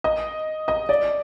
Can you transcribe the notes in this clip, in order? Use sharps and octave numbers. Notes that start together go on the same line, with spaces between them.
D#5
D#5
D5